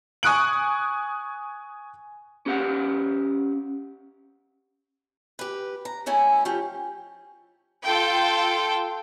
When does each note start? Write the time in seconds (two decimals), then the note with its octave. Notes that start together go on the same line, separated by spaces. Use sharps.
0.23 G#5 C#6 D#6 F#6 D7 F#7
2.46 C#4 G4 F5 F#5
5.39 G4 B4
5.85 A#5
6.06 G#3 A3 C#4 E4
6.45 F3 C#4 G4
7.84 F4 A4 G5